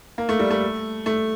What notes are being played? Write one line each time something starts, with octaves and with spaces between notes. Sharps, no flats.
A#3
A3
G3
A3
A3